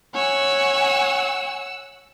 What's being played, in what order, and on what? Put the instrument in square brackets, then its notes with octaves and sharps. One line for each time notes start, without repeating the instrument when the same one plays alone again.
[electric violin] C#5 G#5 [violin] F#5 E6